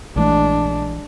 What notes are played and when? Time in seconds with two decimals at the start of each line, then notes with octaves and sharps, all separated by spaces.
0.16 A#1 E3 G#3 A3 D4